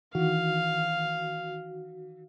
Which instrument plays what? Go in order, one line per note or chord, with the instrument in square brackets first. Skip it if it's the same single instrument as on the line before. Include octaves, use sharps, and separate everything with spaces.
[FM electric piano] D#3 F#4 [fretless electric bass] E3 [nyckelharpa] F5